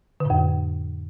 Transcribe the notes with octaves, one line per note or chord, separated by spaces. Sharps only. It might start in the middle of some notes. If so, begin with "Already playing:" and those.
F2 A2 D3